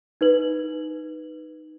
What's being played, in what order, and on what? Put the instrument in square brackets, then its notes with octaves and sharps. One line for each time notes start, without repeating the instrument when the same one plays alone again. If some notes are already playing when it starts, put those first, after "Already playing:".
[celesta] D#4 B4 F#7